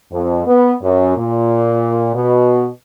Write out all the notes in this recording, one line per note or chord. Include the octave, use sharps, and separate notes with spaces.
F2
B3
F#2
A#2
B2